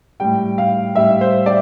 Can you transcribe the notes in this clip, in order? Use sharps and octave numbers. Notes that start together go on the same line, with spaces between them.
A2 G3 G5
F5
A2 G3 E5
C5
D5